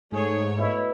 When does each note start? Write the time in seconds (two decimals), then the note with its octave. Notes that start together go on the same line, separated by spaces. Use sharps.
0.12 G#2 A3 G#4 C#5
0.58 B2 E4